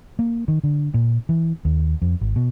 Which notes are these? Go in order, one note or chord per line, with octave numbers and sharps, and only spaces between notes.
A#3
D#3
D3
A#2
E3
D#2
F2
G#1
B2